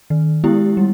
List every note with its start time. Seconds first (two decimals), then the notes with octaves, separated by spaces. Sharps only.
0.10 D#3
0.44 G#3 B3 E4 G4
0.77 G3